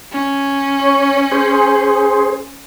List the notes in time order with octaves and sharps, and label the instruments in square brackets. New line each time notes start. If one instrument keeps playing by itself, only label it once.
[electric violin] C#4
[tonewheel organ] C#5
G#4 C5